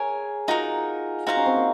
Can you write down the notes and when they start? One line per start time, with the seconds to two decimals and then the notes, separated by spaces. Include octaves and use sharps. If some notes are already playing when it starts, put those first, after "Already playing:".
Already playing: G#4 A#4 C#5 G#5
0.48 D#4 F4 F#4 A#4
1.27 D#4 F#4 C5 F5 A#5
1.37 C#4
1.46 C4
1.56 A#3